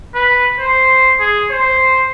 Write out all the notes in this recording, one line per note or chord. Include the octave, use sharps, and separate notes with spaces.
B4
C5
G#4
C5